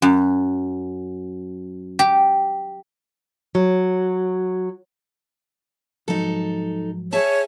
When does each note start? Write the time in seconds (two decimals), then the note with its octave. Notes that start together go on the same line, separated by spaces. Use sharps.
0.02 F#2
1.99 G4
3.55 F#3
6.08 G#2 F3 F#3 D#4 A4
7.12 G#4 C#5 E5 A5